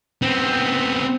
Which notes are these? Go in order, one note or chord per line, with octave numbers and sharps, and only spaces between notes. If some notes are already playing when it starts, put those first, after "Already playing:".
B3 C4